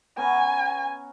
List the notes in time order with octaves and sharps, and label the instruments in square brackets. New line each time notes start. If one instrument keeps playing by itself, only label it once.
[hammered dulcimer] B3 C#4 A#5 [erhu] G#5